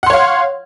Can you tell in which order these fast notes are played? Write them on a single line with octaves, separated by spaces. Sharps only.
F#5 C6 C#5 F5